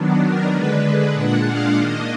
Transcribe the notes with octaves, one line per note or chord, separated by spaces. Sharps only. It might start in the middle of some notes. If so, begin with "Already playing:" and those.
Already playing: D#3 F#3 B3 D4
A#4
D3 G#3 D4 B4
A#2 G#3 D4 F#5
F5
D#3 A#3 D4 D#5